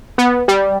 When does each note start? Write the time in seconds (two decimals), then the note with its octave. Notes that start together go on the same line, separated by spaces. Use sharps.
0.18 B3
0.48 G3